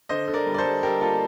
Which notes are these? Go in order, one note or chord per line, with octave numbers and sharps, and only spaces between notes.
D3 C5 D#5
D3
A#4 D5
G3
D5
A4 C5
G3
G3 G4 A#4
A#3 F4 A4